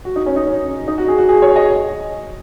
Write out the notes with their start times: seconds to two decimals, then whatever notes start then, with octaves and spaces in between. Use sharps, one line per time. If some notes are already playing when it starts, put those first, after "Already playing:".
0.05 F#4
0.16 D#4
0.26 C#4
0.36 D#4
0.46 C#4
0.88 D#4
0.98 F#4
1.08 G#4
1.18 F#4
1.29 G#4
1.42 C#5
1.56 D#5